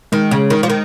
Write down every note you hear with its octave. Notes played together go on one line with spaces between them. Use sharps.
D#3 G#3
C#3
D#3
F3
D#3